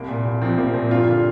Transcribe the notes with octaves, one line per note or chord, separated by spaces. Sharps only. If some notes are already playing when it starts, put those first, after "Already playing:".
Already playing: C2 A#3
A#2
C2
F3 C4
C2 A#3
A#2 C4
G2 F4
D3